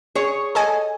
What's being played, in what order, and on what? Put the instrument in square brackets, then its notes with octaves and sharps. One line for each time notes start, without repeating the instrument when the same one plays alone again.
[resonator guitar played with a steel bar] G#4 C#5
[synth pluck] A4 D#5 G#5